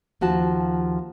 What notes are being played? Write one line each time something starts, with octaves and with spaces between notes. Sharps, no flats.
D#2 F3 F#4 A5